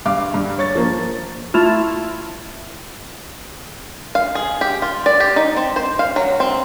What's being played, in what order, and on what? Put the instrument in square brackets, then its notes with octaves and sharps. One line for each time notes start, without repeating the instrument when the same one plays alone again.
[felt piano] G2 F5 D6
G2
C#5 C#6 A6
F3 A#3
[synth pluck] A3 E4 F4
[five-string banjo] F5
G#4
G4
F4
D5
G4
D#4
C4
C5
F5
F#3
C4